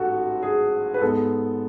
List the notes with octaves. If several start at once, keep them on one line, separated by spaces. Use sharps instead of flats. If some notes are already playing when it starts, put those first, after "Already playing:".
Already playing: A1 G#2 F#4 A4
G#4
B4
G#2 G#3 B3 A4